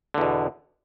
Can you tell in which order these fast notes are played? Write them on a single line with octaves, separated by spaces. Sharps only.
D3 E2 B2